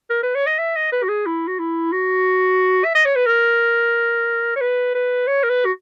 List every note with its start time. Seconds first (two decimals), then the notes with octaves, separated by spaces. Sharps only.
0.10 A#4
0.23 B4
0.35 C#5
0.47 D#5
0.59 E5
0.76 D#5
0.93 B4
1.03 F#4
1.09 G#4
1.26 E4
1.48 F#4
1.59 E4
1.92 F#4
2.85 E5
2.95 D#5
3.06 C#5
3.16 B4
3.27 A#4
4.56 C#5
4.61 B4
4.95 B4
5.27 C#5
5.43 A#4
5.50 B4
5.66 F#4